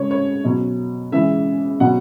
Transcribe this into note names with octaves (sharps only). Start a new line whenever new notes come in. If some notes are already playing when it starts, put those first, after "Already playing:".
Already playing: C#3 G#3 C#5
C#5
B2 F#3
C#3 E3 G#3 E5
B2 F#3 F#5